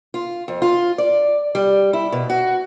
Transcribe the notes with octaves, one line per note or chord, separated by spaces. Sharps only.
F4
F2
F4
D5
G3
E4
B2
F#4